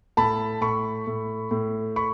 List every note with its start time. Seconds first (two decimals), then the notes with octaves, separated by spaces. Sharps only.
0.17 A2 A5 B5
0.61 A2 B5 C#6
1.07 A2
1.51 A2
1.96 B5 C#6